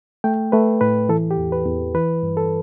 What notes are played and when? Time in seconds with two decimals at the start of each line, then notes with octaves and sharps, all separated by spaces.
0.24 A3 G5
0.52 A3 B4
0.81 A2 B4
1.09 E3 A4
1.31 G4
1.38 E2
1.52 B4
1.66 E2
1.95 E3 B4
2.23 G2
2.37 A4